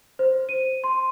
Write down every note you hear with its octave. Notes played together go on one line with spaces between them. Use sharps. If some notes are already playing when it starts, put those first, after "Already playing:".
C5
D#7
C6